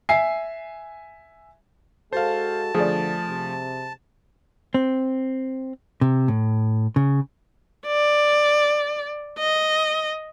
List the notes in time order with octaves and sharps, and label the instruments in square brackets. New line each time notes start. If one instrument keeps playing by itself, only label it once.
[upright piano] E5 G#5 C7
[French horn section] G#3 F#4 A4 [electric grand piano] C5 F5 [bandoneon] A5
[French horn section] D3 [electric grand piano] F3 A3 [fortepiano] G#4 D5
[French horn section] C3
[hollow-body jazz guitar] C4
C3
A2
C#3
[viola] D5
D#5